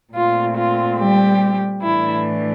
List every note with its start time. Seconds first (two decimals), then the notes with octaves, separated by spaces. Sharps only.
0.14 A#2 A3 C4 F4
0.56 F4
0.99 G3 G4
1.83 A2 E3 A3 D4 E4